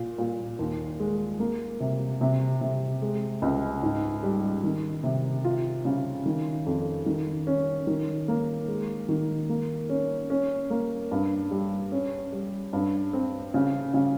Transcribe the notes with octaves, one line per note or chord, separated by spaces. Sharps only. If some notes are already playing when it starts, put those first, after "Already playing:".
Already playing: A#2
A#2
D#2
G#3
A#3
C3
C3
C3
G#3
C#2
G#2
G3
D#3
C3
F4
C#3
D#3
F2
D#3
C#4
D#3
A#3
G#3
D#3
A#3
C#4
C#4
A#3
G2
G3
C#4
G3
G2
C4
C#3
C#3